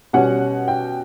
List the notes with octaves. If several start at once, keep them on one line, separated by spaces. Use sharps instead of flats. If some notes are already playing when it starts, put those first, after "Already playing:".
B2 G3 C#4 F#5
G5